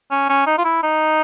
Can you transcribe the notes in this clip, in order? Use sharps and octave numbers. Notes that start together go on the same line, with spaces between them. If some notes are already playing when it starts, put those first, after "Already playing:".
C#4
C#4
D#4
F4
E4
D#4